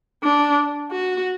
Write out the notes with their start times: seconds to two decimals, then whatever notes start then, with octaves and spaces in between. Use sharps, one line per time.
0.23 D4
0.91 F#4